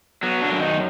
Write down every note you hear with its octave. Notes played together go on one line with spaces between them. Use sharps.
F#3 B3
D3 D4
F#2
D#3 D#4